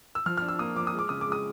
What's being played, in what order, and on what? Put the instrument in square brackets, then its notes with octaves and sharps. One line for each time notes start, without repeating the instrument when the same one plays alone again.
[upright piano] E6
F3 F6
D4 F6
E6
A#3 D#6
F3 D6
D#6
G#3 D6
C#3 D#6
D6
G#3
D#6